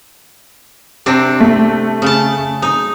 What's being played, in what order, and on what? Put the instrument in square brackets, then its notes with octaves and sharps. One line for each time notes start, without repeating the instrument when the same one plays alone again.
[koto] C3 C4 D4
[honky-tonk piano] A3
[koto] C#3 A5
D#4